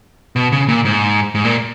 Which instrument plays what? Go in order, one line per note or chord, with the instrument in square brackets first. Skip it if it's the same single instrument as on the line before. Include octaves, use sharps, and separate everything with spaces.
[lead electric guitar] B2
C#3
A#2
G#2
G#2
A#2